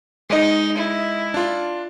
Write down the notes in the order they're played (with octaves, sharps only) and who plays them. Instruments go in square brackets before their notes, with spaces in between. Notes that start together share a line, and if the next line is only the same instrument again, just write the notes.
[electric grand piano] G#3 D#5 [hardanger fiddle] D#4
[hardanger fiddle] E4
[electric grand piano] D4 F4